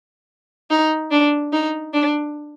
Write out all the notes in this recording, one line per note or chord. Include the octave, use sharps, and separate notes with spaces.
D#4
D4
D#4
D4